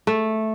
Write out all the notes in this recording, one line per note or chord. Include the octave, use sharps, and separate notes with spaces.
A3